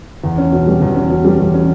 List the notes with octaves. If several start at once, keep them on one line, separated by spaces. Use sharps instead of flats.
E2
C#4
B2
G3
E2
C#4
B2
G3
E2
C#4